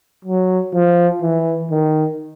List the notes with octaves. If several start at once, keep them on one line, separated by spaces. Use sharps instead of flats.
F#3
F3
E3
D#3